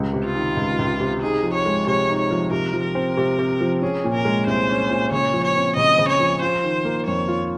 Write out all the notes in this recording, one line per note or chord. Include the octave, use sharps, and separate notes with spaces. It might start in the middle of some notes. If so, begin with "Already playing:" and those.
Already playing: C#2 G3
C3
F4
D#3
C#2
C#2
C3
D#4 G#4
F3
C#5
G#3
C3 C#5
D#4
C#5
F3
C3 A#4
F3
A#4
C4
C3
C3
F3
C#4 G#4
A#2
A#4
G#3
C2 C5
C#4
A#2
C#3 C#5
F3
C#5
C4
C#3 D#5
C#3
C#5
F3
F4 C5
D#3
A#3
F2 C#5
F4